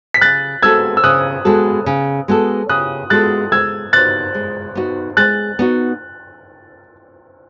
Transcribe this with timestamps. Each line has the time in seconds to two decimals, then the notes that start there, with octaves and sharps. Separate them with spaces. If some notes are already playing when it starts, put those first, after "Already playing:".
0.14 B6
0.21 C#3 F#6 A6
0.62 G#3 B3 F#4 A4 E6 G#6
0.97 E6
1.04 C#3 D#6 F#6
1.45 G#3 B3 F#4 A4
1.86 C#3
2.28 G#3 B3 F#4 A4
2.69 C#3 D#6 F#6
3.10 G#3 B3 F#4 A4 F#6 A6
3.52 G#3 E6 G#6
3.93 B3 D#4 F#4 F#6 A6
4.34 G#3
4.75 B3 D#4 F#4
5.17 G#3 F#6 A6
5.59 B3 D#4 F#4